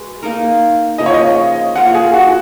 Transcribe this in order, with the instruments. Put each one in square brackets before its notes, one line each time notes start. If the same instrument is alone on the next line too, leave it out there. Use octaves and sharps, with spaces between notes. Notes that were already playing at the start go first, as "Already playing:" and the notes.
Already playing: [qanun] G#3 F#4 B4
A#3 D#4 A#4
[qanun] C#3 F3 A#3 [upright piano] D#5
[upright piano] C#5
D#5
[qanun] A#3 F4 A#4 C#5 [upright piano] F#5
[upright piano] G#4
F#4